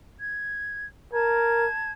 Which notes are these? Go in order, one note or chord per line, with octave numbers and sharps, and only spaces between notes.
G#6
A#4 A5 G#6